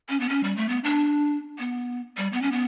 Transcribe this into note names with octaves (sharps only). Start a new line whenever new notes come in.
C#4
B3
C#4
G3
A3
B3
D4
B3
G3
B3
C#4
B3